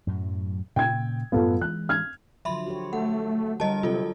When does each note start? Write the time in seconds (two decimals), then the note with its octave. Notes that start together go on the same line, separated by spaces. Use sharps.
0.07 F#2 A2 F#3
0.76 A#2 C#3 G5 G#6
1.32 F#2 A2 G3 B3 F4 A4
1.61 E3 G#3 F#6
1.89 F6 G#6
2.45 D3 F3 F#3 E5 B5 C6
2.66 F#4 G4 C#5
2.93 A3 F#5
3.60 D3 G3 G4 A#4 D#5 A5
3.83 C3 F#3 F4 A4 D#5